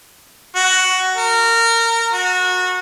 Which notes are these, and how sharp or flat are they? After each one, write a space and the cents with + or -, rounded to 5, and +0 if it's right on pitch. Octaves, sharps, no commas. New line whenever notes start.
F#4 +10
A#4 -20
F#4 -20